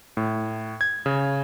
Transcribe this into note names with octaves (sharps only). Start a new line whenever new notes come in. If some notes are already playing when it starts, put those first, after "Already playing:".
A2
G#6
C#3